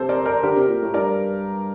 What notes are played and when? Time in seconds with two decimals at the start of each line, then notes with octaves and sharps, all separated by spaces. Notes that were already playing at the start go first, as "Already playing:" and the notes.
Already playing: C3 A4 C5
0.09 A#4 D5
0.26 A#4 D5
0.43 D3 G4 A#4
0.56 C3
0.68 A#2
0.81 A2
0.94 G2 A#4 D5